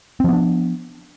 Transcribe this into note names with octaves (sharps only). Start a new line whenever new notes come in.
F3 B3 C4 D4